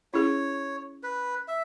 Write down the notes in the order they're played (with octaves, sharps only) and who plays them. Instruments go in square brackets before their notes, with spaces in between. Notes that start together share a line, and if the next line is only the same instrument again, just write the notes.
[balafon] C#4 E4 G#4 [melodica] C#5
[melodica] B4
E5